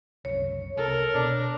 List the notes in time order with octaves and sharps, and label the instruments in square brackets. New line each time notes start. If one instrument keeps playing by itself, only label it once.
[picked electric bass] F#1 C2 [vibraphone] C#5
[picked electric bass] C2 [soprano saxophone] A4 [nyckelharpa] A#4
[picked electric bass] B2 [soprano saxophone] D4